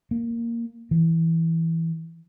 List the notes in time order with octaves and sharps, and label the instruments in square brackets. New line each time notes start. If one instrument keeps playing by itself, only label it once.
[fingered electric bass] A#3
E3